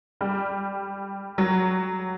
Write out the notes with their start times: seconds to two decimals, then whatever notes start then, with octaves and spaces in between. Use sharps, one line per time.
0.21 G3
1.38 F#3